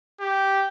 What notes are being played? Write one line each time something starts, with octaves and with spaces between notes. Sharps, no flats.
G4